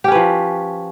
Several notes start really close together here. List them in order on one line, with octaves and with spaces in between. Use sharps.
G4 C#4 B4 F3